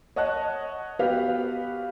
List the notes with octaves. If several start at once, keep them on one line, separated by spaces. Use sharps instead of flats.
C#5 D#5 F#5 A5 F#6
B3 F#4 G4 B4 F5